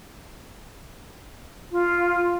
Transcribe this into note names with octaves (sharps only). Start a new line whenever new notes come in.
F4